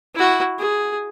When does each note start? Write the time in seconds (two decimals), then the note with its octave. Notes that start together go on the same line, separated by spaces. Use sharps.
0.15 E4 F#4
0.59 G#4